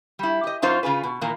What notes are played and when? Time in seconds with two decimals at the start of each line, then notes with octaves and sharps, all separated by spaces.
0.19 G3 E4
0.44 G4 D#5
0.62 F#2 D#4 F4 C5
0.83 C#3 F4 G#4 B4
1.03 B2
1.21 A#2 D#3 E3 A#3